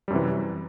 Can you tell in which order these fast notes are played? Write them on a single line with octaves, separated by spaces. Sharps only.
G3 F#2 C3 E3